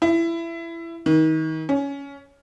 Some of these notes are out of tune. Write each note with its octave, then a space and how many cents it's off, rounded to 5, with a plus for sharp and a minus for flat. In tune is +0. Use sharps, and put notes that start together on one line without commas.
E4 +20
D#3 +30
C#4 +15